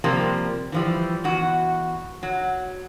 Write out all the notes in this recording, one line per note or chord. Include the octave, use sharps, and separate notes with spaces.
C3 F3 G3 A#3
E3 F3 G3
E2 F#4
F#3